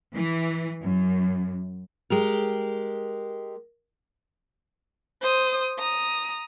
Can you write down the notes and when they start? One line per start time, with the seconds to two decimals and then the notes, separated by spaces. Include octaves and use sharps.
0.15 E3
0.82 F#2
2.10 G#3 G4 A#4
5.22 C5 D#6
5.79 A#5 D#6